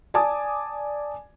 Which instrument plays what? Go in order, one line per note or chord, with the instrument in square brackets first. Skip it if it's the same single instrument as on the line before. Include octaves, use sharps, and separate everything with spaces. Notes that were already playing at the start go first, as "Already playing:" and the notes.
[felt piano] D5 G#5 A5 D6 D#6